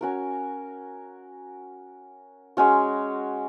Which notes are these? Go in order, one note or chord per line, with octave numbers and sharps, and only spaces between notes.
C#4 F#4 A#4
G#3 C#4 F#4